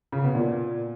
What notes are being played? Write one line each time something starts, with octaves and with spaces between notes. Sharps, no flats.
C#3
B2
A#2